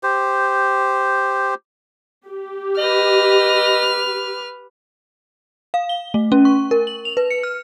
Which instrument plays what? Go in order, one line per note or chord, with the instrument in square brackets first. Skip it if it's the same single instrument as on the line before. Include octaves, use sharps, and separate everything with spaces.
[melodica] G4 C5
[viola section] G4
[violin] B4 F6 [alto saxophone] D#5
[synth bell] F5
G7
A3
C#4
C#6
A#4
F#7
F7
B4
C#7
F6